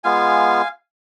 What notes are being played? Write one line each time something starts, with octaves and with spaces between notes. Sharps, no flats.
G#3 B3 F4 F5 G#5